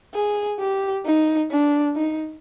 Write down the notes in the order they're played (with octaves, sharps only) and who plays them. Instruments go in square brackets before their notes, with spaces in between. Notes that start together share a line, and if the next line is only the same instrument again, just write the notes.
[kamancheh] G#4
G4
D#4
D4
D#4